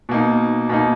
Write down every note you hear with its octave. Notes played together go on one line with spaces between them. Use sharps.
B2 A#3 D#4
B2 A#3 D#4